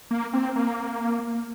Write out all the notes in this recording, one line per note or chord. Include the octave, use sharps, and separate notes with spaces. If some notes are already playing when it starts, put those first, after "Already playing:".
A#3
C4
A#3